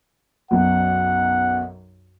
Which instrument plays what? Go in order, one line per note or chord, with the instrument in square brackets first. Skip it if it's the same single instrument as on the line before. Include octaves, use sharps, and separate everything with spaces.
[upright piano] B1 F#2 B2 [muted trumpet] F#5